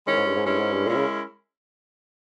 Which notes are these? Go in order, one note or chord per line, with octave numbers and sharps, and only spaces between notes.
D#3 G#3 C#4 E4 A#4
G#2
G2
G#2
G2 G#3 C#4 E4 A#4
G#2
G2
A#2 G#3 C#4 E4 A#4
C#3